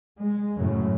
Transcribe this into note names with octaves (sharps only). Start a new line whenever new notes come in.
G#3
F#2 A2 C#3